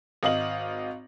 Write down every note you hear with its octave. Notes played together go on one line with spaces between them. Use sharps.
G#1 D#5 F5 F#7